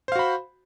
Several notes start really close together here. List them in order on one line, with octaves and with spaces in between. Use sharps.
C5 F5 F#4 B5